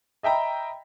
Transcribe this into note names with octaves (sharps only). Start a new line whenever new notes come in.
D#5 E5 G5 A#5 B5